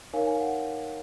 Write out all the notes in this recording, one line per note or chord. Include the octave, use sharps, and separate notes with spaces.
D#4 A#4 C#5 F5 G#5
F5 G#5
F#5